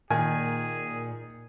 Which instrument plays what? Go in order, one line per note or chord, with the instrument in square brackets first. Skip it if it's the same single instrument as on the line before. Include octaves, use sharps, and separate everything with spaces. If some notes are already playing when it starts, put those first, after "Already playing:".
[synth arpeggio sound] A#2 [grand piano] D#3 [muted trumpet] G#4 [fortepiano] G#5